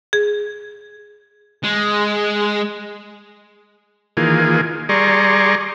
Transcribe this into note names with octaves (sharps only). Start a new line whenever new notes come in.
G#4
G#3
D#3 E3 A#3 F4 G#4
G3 G#4 D5 A#5 C6 C#6